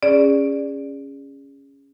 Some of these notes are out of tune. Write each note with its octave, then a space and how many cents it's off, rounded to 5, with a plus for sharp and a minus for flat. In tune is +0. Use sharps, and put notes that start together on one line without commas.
C#4 +0 G#4 -20 D5 +0